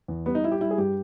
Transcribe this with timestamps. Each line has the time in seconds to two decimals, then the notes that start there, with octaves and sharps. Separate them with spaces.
0.08 E2
0.26 G3 B3
0.35 D#4
0.44 G3 E4
0.52 G4
0.61 G3 E4
0.71 G#4
0.78 G2 G4